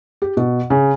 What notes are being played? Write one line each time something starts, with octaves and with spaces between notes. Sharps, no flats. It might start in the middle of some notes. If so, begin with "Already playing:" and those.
G4
B2
C#3